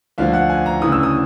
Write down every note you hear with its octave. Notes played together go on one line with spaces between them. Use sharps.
D2 D3 F3 F5
F#5
G#5
A#5
D2 C#3 E3 D#6
E6
D#6